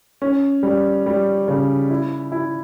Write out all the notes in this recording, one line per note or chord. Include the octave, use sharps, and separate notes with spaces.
C#4
G3
G3
C#3
E4
E4